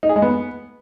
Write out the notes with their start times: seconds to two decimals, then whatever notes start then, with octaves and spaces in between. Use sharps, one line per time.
0.03 D#4
0.09 G#4
0.16 G#3
0.22 B3